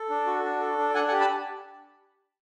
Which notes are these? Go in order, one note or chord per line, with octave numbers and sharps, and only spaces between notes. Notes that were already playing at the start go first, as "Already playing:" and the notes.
Already playing: A4
D4
F#4
D4
A4
D4
D4 F#5 G#5
F#5 G#5
G4
A5 B5